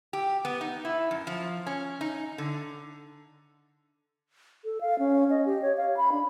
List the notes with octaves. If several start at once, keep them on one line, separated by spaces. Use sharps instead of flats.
G4
B3
D#4
E4
F#2
F3
C#4
D#4
D3
A4
F5
C#4
D#5
G4
C#5
F5
B5
D4